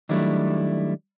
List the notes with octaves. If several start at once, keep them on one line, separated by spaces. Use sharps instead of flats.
D#3 F#3 G3 A3 D4 E4